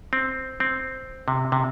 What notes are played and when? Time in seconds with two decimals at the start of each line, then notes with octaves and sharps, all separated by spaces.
0.13 C4
0.60 C4
1.28 C3
1.52 C3